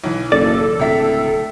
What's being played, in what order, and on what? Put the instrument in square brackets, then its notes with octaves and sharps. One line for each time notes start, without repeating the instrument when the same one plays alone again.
[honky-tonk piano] B1 E3
[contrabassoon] F#1 [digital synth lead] A4 [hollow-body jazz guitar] D5
[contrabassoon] D1 [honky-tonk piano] C#2 E5 B6